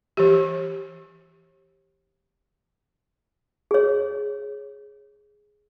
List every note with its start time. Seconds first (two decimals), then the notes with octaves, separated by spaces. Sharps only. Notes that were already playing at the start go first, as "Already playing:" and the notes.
0.17 E3 G4
3.71 G#4 C#5